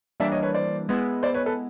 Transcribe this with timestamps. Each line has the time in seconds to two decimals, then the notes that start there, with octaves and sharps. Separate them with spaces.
0.20 E3 G3 A#3 D4 D5 E5
0.32 C#5 D#5
0.43 B4 C#5
0.54 C5 D5
0.89 G#3 B3 E4
1.23 C5 D5
1.34 B4 C#5
1.46 A4 B4